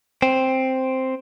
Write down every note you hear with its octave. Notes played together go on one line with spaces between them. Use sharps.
C4